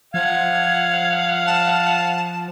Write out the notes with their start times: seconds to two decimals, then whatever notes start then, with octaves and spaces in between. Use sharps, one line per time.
0.14 F3 F5 F#5 G#6
1.47 A5